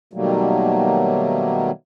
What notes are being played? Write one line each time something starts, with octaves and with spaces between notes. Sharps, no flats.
B2 D#3 F#3 G3 A3 A#3